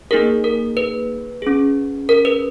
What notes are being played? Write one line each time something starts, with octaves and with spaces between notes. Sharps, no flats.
A#3 D#4 G#4 A#4
A#4
B4
C#4 G#4
A#4
B4